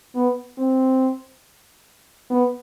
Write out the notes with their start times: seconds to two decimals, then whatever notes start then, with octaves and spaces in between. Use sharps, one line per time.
0.15 B3
0.58 C4
2.30 B3